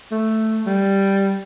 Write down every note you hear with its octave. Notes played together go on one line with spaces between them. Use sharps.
A3
G3